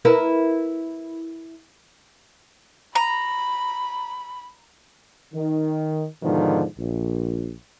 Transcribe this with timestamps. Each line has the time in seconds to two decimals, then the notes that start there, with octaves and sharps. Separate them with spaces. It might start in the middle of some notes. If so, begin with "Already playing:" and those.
0.05 E4 A#4 B4
2.95 A#5 B5
5.33 D#3
6.23 G#2 B2 D3 D#3 F3
6.77 A#1